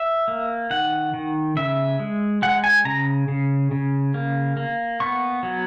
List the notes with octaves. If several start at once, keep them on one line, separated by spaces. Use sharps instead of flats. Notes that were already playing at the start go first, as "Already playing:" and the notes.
Already playing: E5
A#3
D#3 F#5
D#3
C#3 E5
G#3
G#3 F#5
G#5
C#3 A#5
C#3
C#3
A#3
A#3
B3 C#6
F#3